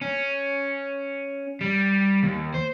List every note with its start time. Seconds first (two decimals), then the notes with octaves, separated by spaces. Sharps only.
0.01 C#4
1.61 G3
2.23 D#2
2.54 C5